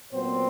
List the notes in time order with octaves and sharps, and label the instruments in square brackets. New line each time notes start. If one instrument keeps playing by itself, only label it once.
[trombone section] A#2 F#3 B3 C4 C5